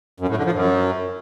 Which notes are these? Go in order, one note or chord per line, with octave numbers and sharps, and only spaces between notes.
F#2
A2
D3
F3
F#2